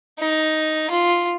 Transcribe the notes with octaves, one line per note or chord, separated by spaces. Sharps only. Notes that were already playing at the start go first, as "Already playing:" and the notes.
D#4
F4